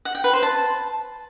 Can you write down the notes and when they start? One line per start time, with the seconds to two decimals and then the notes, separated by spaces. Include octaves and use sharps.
0.05 F#5
0.15 G5
0.24 B4
0.33 C5
0.43 A5